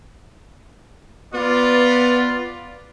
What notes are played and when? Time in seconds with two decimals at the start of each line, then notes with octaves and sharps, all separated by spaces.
1.34 B3 F4 B4 D5